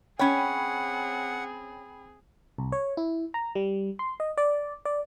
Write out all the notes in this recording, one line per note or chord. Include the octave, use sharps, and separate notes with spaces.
C4 C#4 G#4 C#5 F#5 G5 B5
C2
C#5
E4
A#5
G3
C6
D#5
D5
D5